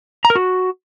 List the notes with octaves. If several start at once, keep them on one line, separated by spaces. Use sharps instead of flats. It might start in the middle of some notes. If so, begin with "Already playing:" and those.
A#5
A#4
F#4